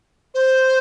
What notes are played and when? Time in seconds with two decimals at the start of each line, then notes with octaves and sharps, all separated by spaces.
0.34 C5